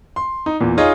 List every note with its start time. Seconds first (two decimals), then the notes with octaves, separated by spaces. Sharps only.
0.16 C6
0.46 D#4
0.60 E2 A#2
0.78 D#4 F4 G#4 C#5 D#5